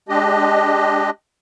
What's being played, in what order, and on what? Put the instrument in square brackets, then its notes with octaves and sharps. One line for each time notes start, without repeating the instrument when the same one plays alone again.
[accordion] G#3 D4 G4 D#5